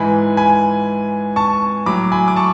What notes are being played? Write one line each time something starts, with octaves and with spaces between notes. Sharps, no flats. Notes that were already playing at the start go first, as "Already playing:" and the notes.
Already playing: G#2 E3 G#5 B5
G#5 B5
A5 C#6
A2 F#3 B5 D6
G#5 B5
D6
A5 C#6